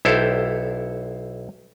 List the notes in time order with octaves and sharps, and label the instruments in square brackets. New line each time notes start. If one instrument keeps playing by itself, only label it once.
[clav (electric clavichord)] B1 E4 G4 A4 C5 F5